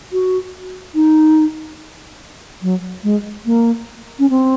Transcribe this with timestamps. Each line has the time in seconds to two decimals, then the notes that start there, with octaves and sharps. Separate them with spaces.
0.12 F#4
0.95 D#4
2.62 F#3
3.04 G#3
3.46 A#3
4.19 C#4
4.30 C4